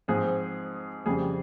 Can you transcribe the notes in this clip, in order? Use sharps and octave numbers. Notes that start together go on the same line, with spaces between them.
G#2 F3 C4 G#4
F2 C#3 G3 G#4